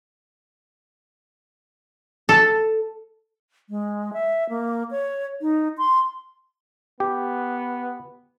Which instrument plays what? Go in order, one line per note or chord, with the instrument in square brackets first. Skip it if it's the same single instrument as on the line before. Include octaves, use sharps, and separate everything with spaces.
[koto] A4
[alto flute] G#3
E5
A#3
C#5
D#4
C6
[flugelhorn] B3 [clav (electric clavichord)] G4